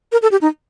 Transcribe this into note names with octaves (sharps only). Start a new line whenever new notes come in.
A#4
A4
G4
D#4